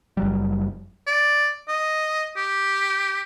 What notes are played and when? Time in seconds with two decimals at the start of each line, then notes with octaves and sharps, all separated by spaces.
0.17 F#1 F#3 G3
1.07 D5
1.68 D#5
2.37 G4